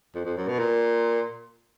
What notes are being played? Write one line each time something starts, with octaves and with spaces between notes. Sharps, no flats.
F2
F2
F#2
B2
A#2